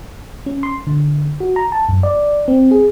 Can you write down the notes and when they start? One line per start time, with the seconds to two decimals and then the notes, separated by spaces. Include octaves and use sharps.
0.46 C#4
0.63 C6
0.87 D3
1.40 F#4
1.56 A#5
1.72 A5
1.89 F#2
2.03 D5
2.48 C4
2.71 G#4